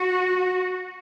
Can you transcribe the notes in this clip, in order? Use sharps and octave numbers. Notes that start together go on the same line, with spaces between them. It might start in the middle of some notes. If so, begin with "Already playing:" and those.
Already playing: F#4